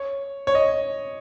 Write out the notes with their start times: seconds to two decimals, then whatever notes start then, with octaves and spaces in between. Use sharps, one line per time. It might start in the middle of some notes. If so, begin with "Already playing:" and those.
Already playing: C#5
0.47 C#5
0.55 D#5